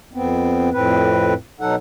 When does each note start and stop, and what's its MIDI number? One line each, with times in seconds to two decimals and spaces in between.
0.13 0.70 41
0.13 0.70 59
0.13 0.70 60
0.72 1.34 41
0.72 1.34 45
0.72 1.34 60
0.72 1.34 71
1.61 1.76 47
1.61 1.76 54
1.61 1.76 63
1.61 1.76 69
1.61 1.76 78